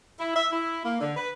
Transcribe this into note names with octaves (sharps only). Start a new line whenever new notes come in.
E4
E5
E4
A#3
D3
B4